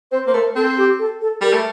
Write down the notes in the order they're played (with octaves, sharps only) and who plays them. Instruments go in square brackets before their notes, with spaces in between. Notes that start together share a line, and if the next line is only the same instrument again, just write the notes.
[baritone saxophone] C4 [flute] C5
[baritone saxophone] A#3 [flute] C5
[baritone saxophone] A3 [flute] A#4
[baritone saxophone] C4 [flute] A4
[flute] G4
A4
A4
[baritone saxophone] G3 [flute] A#4
[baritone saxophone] A3